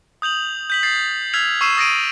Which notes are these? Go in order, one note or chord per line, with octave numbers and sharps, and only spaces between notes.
D#6 G6 F7 F#7
G6 B6 F#7
A6 C7
E6 F6 G#6 B6 C7 F7
C#6 E6 C7 D#7 E7
D#6 A6 A#6 C7 D7 D#7